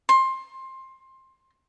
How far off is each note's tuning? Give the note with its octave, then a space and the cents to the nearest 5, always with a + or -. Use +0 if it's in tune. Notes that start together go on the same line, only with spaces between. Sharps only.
C6 +20